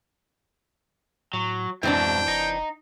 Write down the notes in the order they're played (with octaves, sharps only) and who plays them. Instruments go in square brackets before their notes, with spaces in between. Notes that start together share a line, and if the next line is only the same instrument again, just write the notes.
[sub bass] A2 [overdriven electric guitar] F#3
[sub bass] F2 [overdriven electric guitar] G#2 B2 [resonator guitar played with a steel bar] E3 C4 D4 [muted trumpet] G5
[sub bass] F1 [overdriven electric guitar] D#4